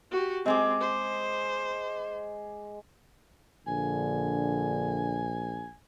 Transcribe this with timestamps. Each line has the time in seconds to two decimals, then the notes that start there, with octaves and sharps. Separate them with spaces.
0.11 F#4 G4
0.46 G#3 C4 G#4 D6
0.80 C5
3.67 A#1 D3 G#5